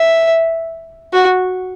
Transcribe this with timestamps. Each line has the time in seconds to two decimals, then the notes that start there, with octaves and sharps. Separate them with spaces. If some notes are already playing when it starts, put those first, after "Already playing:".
Already playing: E5
1.13 F#4